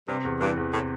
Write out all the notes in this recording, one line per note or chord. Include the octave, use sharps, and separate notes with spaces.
G2 C3
E2
G2 E3
E2
A2 C3